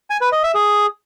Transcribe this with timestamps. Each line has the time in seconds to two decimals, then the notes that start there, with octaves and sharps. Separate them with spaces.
0.10 G#5
0.21 B4
0.32 D#5
0.43 E5
0.55 G#4